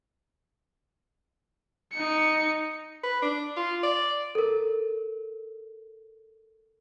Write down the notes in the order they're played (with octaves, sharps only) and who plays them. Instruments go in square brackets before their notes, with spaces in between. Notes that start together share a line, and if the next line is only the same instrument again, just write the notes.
[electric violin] D#4 C#7
[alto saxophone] B4
D4
F4
D5
[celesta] A4 A#4